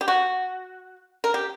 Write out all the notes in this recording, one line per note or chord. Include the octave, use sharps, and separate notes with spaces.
G4
F#4
A#4
G4